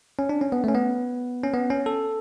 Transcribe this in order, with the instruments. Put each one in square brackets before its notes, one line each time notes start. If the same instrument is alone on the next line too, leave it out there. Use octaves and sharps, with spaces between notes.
[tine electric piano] C#4
D4
C#4
B3
A3 C#4
B3
C#4
B3
C#4
A4